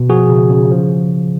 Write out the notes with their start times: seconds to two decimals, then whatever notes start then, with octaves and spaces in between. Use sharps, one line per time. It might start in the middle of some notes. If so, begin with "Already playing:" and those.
Already playing: B2
0.10 F3 F#4 G#4
0.30 C#3
0.50 C#3
0.71 F3